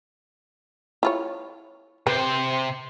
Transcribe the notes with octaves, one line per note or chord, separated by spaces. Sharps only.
E4 F4 C#5
C3 B4 C5